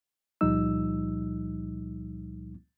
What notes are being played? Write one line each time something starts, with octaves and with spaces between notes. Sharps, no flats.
C#2 A#2 F3 G3 D#4 E6